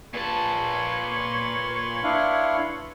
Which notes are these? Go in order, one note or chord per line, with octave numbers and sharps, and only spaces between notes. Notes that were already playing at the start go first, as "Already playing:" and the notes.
A#2 B4 C#5 A5 C6
D4 E4 F5